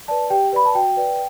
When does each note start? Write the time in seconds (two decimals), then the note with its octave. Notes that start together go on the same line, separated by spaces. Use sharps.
0.08 B4 D5 A5
0.30 G4 G5
0.53 B4 D5 B5
0.66 A5
0.75 F#4 G5
0.97 B4 D5